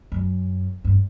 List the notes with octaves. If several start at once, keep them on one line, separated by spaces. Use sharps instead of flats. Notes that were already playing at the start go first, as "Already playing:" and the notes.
F#2
G2